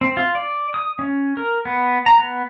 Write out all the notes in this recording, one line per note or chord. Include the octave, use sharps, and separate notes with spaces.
C4
F4
D5
D#6
C#4
A#4
B3
A#5
B3